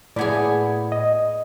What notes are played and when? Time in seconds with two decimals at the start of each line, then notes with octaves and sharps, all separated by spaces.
0.16 A2 A#3 B3 G#4 D5 B5 G#6
0.92 D#5